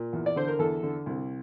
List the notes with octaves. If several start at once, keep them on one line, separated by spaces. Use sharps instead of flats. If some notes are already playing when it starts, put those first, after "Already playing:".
Already playing: A#2
E2
D5
D3 C5
A#4
E2 A4
D3
C2